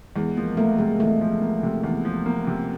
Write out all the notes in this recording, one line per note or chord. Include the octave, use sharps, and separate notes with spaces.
E2 G#3
F3 A#3
A3 A#3
C3 G#3
E2 A3
F3
A#3
C3
E2
F3
A#3
C3